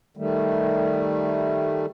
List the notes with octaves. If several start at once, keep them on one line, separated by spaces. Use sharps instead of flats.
D#3 G3 A3